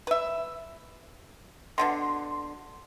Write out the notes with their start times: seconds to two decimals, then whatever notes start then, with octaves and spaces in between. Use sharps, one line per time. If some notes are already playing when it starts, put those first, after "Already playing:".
0.07 B4 E5
1.78 B2 D3 D#3 C6